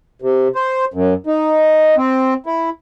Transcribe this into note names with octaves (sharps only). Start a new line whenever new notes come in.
C3
C5
F#2
D#4
C4
E4